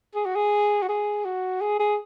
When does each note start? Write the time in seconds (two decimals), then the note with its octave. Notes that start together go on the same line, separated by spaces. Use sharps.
0.15 G#4
0.26 F#4
0.36 G#4
0.82 F#4
0.89 G#4
1.25 F#4
1.61 G#4
1.79 G#4